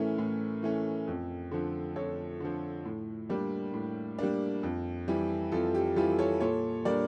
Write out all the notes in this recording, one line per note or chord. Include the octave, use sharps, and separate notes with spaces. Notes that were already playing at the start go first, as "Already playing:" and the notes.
Already playing: A2 E3 A3 C#4 A#4
A2
E3 A3 C#4
F2
D3 F3
F2 A4 C#5
D3 F3
A2
G3 A#3 D4
A2
G3 A#3 D4
F2
E3 G3
F2 F4 A4
G4
E3 G3 F4 A4
A4 C#5
A#2 A4 C#5
G3 A#3 D4 A#4 D5